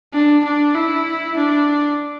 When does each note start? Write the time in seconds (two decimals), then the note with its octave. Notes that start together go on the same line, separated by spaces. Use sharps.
0.14 D4
0.45 D4
0.76 E4
1.37 D4